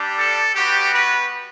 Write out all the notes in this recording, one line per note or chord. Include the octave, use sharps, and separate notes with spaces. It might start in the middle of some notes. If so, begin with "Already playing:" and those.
Already playing: G3 D4 G4
A4
G3 B3 F#4 G4
B4